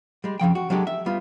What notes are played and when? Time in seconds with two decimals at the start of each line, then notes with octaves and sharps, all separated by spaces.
0.24 G3 G#3
0.40 F2 C#3 F3 G5
0.55 F#4
0.70 F#3 G#3 D4 G4 A4
0.87 E5
1.06 G3 B3 F4